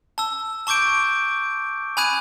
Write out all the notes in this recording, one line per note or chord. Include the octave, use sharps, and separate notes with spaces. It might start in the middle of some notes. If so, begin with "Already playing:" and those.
A5 E6
A5 C#6 D6 G6 D7
G#5 B5 D#6 F#6 G#6 D#7